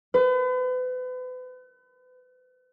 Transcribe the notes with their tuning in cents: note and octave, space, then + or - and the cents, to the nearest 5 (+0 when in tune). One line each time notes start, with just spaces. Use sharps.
B4 +40